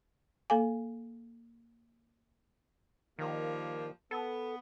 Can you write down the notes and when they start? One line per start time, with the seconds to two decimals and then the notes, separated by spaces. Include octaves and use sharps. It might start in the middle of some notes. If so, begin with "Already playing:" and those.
0.50 A#3 A4 F5 G#5
3.19 D#3 F3 G3 A#3
4.11 B3 A4